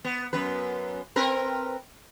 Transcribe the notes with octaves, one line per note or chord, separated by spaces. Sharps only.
B3
F#2 B3 B4
C4 A#4 B4